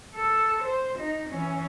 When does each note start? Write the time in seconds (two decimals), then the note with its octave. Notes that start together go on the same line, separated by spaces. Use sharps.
0.15 A4
0.64 C5
0.99 D#4
1.30 E3 C#4